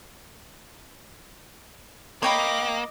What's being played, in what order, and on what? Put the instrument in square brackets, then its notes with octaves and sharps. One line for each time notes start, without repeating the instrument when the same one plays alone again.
[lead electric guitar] A#3 [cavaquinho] C#5 G5 B5 [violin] D#5 D6